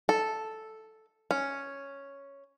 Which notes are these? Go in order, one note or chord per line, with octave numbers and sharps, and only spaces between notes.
A4
C#4